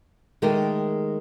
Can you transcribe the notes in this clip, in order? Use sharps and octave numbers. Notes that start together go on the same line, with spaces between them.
D#3 G#3 A3 G4 A4 A#4